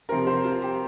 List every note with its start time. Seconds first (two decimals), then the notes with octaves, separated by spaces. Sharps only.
0.09 C3 F3 C4 A#4
0.27 C5
0.44 F4
0.62 G4